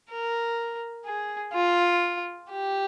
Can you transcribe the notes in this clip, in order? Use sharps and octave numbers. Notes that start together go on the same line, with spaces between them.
A#4
G#4
F4
G4